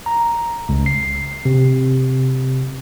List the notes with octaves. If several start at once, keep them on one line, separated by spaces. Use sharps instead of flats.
A#5
C#2
C7
C3